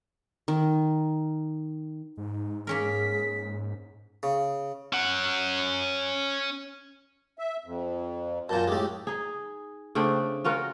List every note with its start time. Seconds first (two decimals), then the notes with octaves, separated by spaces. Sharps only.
0.48 D#3
2.17 G#2 D#4
2.67 A#3 C#4 G#4 A#4 B6
4.23 C#3
4.93 C#4 F#5
7.39 E5
7.66 F2
8.49 F#2 A#2 A#3 A5 G6
8.68 A2 G#3 A3 G4
9.07 D#4 G#4
9.95 C#3 A3 C4 D4
10.44 C#4 F4 F#4 A#4